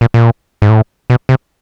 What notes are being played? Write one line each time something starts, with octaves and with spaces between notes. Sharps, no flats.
A#2
A#2
G#2
A2
B2
C3